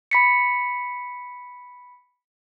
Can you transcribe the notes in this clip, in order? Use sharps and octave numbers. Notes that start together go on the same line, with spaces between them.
B5 B6 C#7